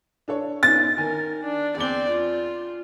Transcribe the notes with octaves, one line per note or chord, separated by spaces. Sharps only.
D4 A4 C#5
B3 C#4 D#4 A6
D#3 A#4 G#5
D4
E2 C4 D5 D6 G7
F4